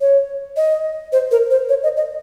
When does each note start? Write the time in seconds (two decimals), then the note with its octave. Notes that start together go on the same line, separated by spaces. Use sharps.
0.01 C#5
0.57 D#5
1.12 C5
1.31 A#4
1.51 C5
1.69 C#5
1.83 D#5
1.97 D#5